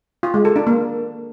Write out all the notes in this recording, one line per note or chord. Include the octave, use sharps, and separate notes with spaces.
F4
G#3
A4
D4
A#3